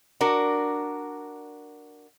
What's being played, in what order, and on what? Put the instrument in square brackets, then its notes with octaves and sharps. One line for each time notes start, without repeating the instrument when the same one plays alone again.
[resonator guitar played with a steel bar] D4 F#4 A#4